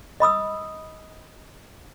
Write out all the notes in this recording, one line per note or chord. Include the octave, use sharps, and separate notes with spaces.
D#5 B5 D#6 E6